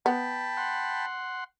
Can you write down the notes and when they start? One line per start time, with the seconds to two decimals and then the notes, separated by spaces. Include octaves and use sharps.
0.06 B3 G5 A5 B5
0.57 F#5 C6